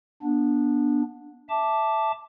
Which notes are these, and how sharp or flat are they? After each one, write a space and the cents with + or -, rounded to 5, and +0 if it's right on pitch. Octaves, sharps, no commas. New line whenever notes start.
B3 -30 D4 +0
E5 +0 A5 +0 D6 +0